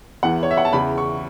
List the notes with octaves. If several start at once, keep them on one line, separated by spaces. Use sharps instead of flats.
E2 E3 B3 F#5
C#5
E5
F#5
A5
E2 C#3 E3 B5
C#6